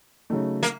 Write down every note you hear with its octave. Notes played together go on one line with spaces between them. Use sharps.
C#3 F#3 A3 D#4
A#3